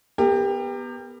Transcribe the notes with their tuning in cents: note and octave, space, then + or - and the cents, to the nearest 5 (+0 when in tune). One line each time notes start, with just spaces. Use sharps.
B3 -10 G4 +25 A#4 -30